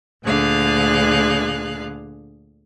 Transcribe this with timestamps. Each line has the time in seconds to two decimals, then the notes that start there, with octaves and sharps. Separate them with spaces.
0.23 D2 A#2 D3 G#4 F5 F#6